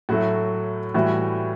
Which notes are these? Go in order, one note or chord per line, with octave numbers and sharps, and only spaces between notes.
A2 F#3 A3 F#4
A2 E3 G3 F#4